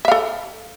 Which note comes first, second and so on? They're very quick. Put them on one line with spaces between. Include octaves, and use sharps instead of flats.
E5 F5 A4